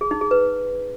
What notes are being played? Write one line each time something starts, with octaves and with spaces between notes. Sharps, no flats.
G#4
D#4
G#4
B4